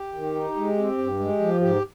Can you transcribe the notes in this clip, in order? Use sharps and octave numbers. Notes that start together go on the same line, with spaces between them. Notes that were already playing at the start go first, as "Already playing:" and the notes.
Already playing: G4
D#3
D#4
G#3
C4
G2
G#3
F3
G#2 G4